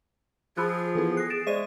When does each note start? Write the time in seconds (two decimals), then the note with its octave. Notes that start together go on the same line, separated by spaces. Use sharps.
0.57 F3 F4 G#4 B5 E6 F#6
0.95 E3 B3 E4 A4 B4 C5
1.17 F#6 A#6 C7
1.30 A6 D7 E7
1.47 G#3 C5 D5 E5 C#6 D#7